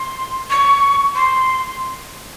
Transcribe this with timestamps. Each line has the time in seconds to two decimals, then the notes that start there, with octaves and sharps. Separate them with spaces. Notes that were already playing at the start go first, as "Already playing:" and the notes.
Already playing: C6
0.50 C#6
1.15 C6